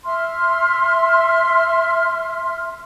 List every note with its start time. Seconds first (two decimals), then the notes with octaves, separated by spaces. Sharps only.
0.05 E5 C6 F6